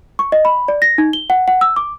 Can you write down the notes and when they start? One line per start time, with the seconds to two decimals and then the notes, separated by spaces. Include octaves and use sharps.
0.19 C#6
0.32 D#5
0.45 B5
0.68 D5
0.82 A#6
0.98 D#4
1.13 G7
1.30 F#5
1.48 F#5
1.61 E6
1.76 D6